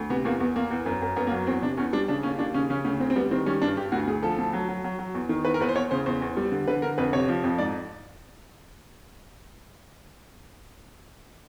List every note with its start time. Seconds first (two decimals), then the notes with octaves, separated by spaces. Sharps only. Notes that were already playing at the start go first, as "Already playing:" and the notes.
Already playing: D2
0.10 C3 B3
0.25 E2 A#3
0.40 E2 B3
0.56 E2 A#3
0.70 E2
0.86 F#2
1.02 F#2
1.16 F#2 B3
1.27 A#3
1.32 F#3
1.47 E2 C4
1.62 C3 D4
1.77 E2 C#4
1.93 G3 D4
2.08 C#3 D4
2.23 D#2 C#4
2.39 D#2 D4
2.54 C#3 C#4
2.70 C#3 C#4
2.84 D2 C#4
3.00 D2 C4
3.10 C4
3.16 G3 B3
3.31 D#3 C4
3.46 G3 C#4
3.62 G2 D4
3.77 G2 G4
3.92 D2 F#4
4.07 D2 G#4
4.23 F3 A4
4.38 D2
4.53 F#3
4.69 F#3
4.84 F#3
4.99 F#3
5.14 E2
5.29 D#3
5.45 E2 B4
5.54 A#4
5.60 E2 B4
5.69 C5
5.76 E2 C#5
5.91 C#3 C5
6.06 E2 C5
6.22 E2
6.37 G3
6.52 D3
6.68 D3 B4
6.82 D3 A#4
6.98 F2 B4
7.13 C3 C#5
7.29 F3
7.44 F2
7.59 G#2 D5